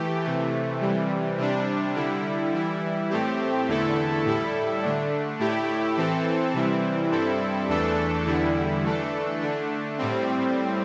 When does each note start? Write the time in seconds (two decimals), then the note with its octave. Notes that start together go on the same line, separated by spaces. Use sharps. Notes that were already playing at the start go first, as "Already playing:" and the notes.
Already playing: E3 A3 G4
0.24 C3 E3 A3
0.81 C3 E3 G3
1.38 C3 G3 D4
1.95 D3 G3 E4
2.53 E3 G3 E4
3.10 A2 A3 C4 G4
3.68 E2 D3 A3 E4 A4
4.25 A2 G3 E4 A4
4.83 D3 A3 D4
5.39 A2 A3 E4 G4
5.97 E3 C4 A4
6.54 C3 E3 G3 C4 E4
7.12 G2 G3 C4 E4 A4
7.69 E2 E3 A3 D4 A4
8.26 E2 D3 G3 E4
8.83 E3 A3 D4 A4
9.41 D3 A3 D4
9.98 A2 G3 C4